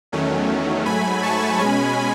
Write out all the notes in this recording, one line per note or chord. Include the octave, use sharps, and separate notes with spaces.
E2 D#3 F#3 A3 C#4
G#2 F#3 A3 G#5 B5
A5 C#6
B2 G#3 C#4 G#5 B5